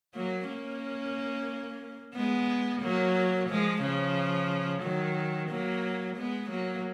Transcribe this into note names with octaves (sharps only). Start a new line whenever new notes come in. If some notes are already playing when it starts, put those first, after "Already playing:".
F#3 A#3
A#3 C#4
G#3 B3
F#3 A#3
F3 G#3
C#3 F3
D#3 F#3
F#3 A#3
G#3 B3
F#3 A#3